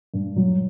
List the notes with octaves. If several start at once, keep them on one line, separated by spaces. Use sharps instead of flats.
G2
F#3